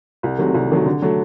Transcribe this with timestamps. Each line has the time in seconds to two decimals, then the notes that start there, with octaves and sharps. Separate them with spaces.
0.23 C2
0.38 C3 D#3 F#3 A3
0.54 C2
0.70 C3 D#3 F#3 A3
0.86 D3
1.02 F#3 A3